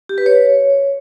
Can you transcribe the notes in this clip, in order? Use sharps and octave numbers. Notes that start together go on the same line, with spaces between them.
G4
B4
C#5